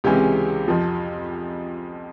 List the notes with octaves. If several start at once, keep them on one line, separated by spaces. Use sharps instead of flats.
C#2 C3 E3 G#3 C#4 G4
F2 C3 F3